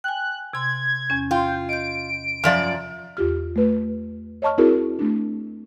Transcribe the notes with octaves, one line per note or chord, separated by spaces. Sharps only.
G5 G#5 F#6
C3 C6 G#6
E2 C#4
F4 G5
D#5 G6 D7
F#2 F3 D5 E5
E2 F4 G4 F6
A3 B4
C#5 D#5 A5 C#6 F6
C4 E4 F#4 G#4 A#4
A3 D4